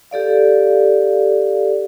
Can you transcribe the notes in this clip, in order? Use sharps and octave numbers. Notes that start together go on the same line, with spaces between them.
G4 A4 D5 F5